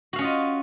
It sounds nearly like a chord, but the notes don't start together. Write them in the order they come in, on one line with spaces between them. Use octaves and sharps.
F#4 F5 C#4 D#5 F4